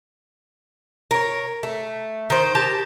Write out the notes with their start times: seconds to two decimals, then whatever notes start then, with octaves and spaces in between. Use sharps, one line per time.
1.11 A#4 C#5
1.63 A3
2.30 D#3 C5
2.55 G4 A#4 A5